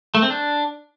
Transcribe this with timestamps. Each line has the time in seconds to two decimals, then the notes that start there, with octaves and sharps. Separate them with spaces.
0.15 A3
0.22 C4
0.30 D4